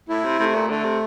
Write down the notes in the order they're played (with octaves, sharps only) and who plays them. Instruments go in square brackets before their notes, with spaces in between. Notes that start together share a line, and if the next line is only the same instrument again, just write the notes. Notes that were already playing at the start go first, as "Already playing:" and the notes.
[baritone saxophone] A2 [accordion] E4
[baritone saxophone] C3
[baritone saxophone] C3 [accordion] A3
[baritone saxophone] A#2
[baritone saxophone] D3 [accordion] A3
[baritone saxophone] C3